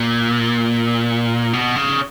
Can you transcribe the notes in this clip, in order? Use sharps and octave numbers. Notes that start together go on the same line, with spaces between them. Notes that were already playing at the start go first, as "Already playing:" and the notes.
Already playing: A#2
B2
C#3